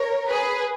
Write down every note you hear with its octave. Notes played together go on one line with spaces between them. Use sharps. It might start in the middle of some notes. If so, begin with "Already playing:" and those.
Already playing: A#4 C#5
G#4 B4